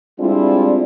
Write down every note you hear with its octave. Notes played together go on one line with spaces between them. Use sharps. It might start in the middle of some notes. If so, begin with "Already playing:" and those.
G3 G#3 C4 D4 E4 F4